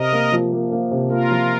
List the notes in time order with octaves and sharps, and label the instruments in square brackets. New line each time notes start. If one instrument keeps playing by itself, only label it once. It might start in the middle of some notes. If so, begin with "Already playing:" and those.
Already playing: [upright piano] C3 [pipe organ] A#4 D#5
[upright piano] A#3
F3
A#3
A#3
C3
[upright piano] A#3 [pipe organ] F4 A#4
[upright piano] F3